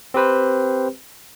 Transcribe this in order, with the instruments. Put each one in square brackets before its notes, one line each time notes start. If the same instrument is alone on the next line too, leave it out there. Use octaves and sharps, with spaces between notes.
[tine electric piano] C4 G4 B4 C5